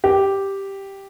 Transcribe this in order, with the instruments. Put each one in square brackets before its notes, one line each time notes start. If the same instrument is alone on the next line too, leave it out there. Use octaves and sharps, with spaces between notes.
[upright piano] G4